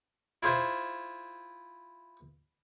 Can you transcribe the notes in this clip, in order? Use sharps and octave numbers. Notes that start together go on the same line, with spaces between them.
E4 F4 G#4 C5 E5